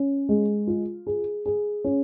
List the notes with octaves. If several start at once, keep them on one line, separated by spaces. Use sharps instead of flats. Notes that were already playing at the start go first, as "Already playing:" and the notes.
Already playing: C#4
G#3
F4
G#4
G#4
C#4